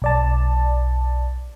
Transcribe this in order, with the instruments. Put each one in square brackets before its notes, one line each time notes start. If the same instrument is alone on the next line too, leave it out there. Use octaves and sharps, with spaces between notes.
[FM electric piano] B1 D5 A5